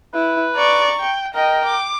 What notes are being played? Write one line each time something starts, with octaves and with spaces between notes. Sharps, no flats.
E4 B4
D5 A#5 C#6
G5
A#4 D#5 G5
D6